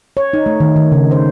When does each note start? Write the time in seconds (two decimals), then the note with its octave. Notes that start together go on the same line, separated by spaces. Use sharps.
0.17 C#5
0.33 D#4
0.46 A3
0.60 D#3
0.76 D#3
0.92 C#3
1.11 C5